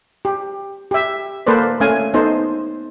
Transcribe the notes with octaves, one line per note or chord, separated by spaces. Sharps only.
G4
G4 E5
A#3 A4 B4 C5 D5
A3 C#4 F5 G#5
B3 D#4 A4 C5